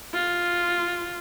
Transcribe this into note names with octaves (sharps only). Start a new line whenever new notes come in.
F4